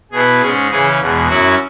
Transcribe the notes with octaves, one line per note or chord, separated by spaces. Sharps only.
B2 B3 E4 G#4
G#2 G#3 C#4 G#4
C#3 E3 C#4 G#4
E2 B2 G#3
F#2 F#3 C#4 E4 F#4